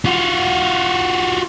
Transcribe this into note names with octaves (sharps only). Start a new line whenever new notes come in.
F4 F#4